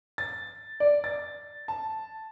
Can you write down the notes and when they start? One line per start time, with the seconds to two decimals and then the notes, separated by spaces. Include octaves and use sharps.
0.18 A6
0.80 D5
1.04 A6
1.68 A5